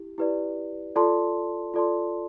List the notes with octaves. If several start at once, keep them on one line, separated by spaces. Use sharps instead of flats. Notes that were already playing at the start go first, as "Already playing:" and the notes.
Already playing: E4 G4
E4 G4 B4 D5
F4 A4 D5 A5 C6
F4 A4 D5 A5 C6